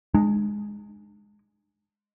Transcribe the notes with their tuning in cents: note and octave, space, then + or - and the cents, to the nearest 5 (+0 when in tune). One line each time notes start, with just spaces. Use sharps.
G#3 +0 D4 +40